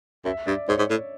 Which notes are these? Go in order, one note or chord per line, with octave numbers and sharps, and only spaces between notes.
F#2 E5
G2 D5
G#2 C#5
G#2
A2